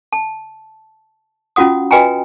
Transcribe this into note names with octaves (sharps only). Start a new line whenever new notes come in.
A5
C#4 F4 F#4 F#5 D#6
F#4 B4 D#5 G5 G#5 A#5